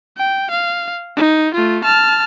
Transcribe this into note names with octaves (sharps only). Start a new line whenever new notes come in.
G5
F5
D#4
A3 F4
A5 F6